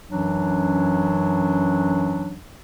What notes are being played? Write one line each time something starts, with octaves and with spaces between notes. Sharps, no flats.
F#2 E3 F#3 C#4 D4